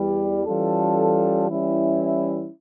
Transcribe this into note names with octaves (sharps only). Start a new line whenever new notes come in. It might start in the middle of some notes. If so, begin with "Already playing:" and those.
Already playing: E2 E3 G3
E3 G3 C#4 F4 A4
E3 G3 C#4 E4